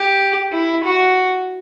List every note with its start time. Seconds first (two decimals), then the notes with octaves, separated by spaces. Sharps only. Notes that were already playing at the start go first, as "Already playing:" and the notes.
Already playing: G4
0.52 E4
0.84 F#4